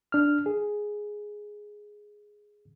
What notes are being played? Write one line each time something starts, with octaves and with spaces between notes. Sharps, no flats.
D4 F6
G#4